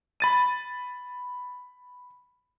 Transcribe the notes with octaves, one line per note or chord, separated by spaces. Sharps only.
B5 A6 D#7